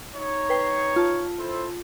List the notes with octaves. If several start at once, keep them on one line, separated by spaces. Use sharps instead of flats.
D#4 C#5
B4 G5 C7
F4 A5
E4 A4 C5